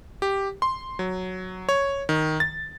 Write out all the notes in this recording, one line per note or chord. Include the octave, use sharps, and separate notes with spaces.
G4
C6
F#3
C#5
D#3
A6